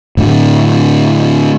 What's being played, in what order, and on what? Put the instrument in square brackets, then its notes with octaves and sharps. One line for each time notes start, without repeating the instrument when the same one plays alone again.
[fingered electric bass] A2 D3